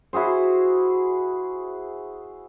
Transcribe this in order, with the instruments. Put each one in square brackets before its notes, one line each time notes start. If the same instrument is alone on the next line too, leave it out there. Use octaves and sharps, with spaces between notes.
[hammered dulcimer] E4 F#4 G#4 C5